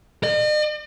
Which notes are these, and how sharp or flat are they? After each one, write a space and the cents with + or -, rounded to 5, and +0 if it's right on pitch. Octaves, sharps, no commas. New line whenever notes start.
D#5 -45